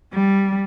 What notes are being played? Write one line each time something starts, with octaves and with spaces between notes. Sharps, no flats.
G3